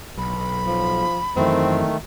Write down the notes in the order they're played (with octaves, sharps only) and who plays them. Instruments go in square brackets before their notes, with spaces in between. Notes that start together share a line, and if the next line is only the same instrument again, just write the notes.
[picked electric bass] B1 [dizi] B5
[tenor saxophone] F3
[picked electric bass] F#2 E3 [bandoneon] D#3 A3 [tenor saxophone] C4